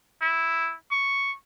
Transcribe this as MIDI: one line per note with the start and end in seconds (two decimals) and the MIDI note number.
0.21 0.74 64
0.91 1.34 85